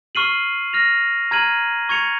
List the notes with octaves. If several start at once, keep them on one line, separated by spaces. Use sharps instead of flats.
C#6 F6 C7 D#7 F#7
F6 A#6 F7
A#5 F6 G#6 D#7 F#7
C#6 G#6 C#7 F7